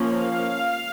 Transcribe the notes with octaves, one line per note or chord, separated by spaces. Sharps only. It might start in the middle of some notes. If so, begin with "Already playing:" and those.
Already playing: F3 A#3 C#4
F5